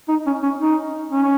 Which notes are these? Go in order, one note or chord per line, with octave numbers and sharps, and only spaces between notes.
D#4
C#4
C#4
D#4
C#4